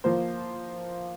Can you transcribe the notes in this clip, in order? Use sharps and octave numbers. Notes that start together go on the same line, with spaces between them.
F3 A#3 F4 C5